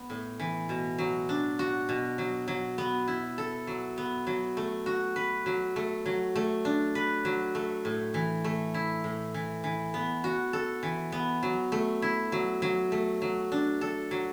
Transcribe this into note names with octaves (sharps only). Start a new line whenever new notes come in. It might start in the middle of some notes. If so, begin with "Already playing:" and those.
Already playing: B3
A2
E3
B2
F#3
D4
F#4
B2
F#3
F#3
B3
E4
A4
F#3
B3
F#3
A3
F#4
B4
F#3
A3
F#3
A3
D4
B4
F#3
A3
A2
E3
A3
E4
A2
E3
E3
B3
F#4
A4
E3
B3
F#3
A3
E4
F#3
F#3
A3
F#3
D4
A4
F#3